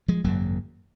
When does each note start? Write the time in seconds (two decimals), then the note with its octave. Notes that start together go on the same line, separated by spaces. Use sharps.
0.08 F3 G#3
0.24 G#1 F#2 C#3 F#3 A#3